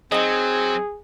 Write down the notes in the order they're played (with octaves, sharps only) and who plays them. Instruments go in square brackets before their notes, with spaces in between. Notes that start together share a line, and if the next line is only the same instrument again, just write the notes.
[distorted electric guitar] F#3 [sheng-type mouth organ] C4 [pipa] D#4 D#5 [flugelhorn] G#4